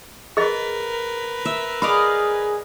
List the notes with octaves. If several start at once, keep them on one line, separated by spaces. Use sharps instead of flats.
G#4 A#4 B4 D#5
E5
G#4 D5 D#5 F5 B5